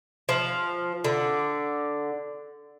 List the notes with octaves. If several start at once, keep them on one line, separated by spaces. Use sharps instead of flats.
F3
D3